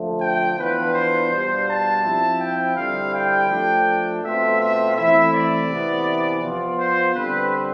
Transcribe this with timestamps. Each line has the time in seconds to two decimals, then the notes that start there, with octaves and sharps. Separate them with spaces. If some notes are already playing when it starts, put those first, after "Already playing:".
Already playing: D3 F3 A3
0.21 G5
0.58 E3 B3 D4 F4 B4
0.94 C5
1.31 B2 G3 D4 F4 C5
1.68 A5
2.04 F3 C4 E4
2.40 G5
2.76 D3 G3 C4 E4 F5
3.13 G5
3.50 F3 A3 D4
4.23 B2 A3 C4 F4 E5
4.59 E5
4.96 E3 A3 C4 E4 E5
5.33 D5
5.69 C3 E3 B3
6.42 F3 B3 F4
6.78 C5
7.15 D3 G3 C4 B4